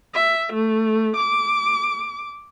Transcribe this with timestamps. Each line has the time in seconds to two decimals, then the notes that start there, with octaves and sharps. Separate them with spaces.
0.14 E5
0.53 A3
1.16 D6